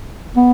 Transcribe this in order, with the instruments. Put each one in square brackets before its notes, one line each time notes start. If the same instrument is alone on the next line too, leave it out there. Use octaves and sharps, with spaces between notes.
[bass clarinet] B3